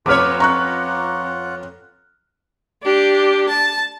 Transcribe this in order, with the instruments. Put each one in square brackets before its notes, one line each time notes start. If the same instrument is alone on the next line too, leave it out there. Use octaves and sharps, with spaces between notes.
[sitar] F2 B4 C#5 [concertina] F4 F#5 [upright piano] D6 F6
[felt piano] A#5 C#6 F#6
[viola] D4 G4
A5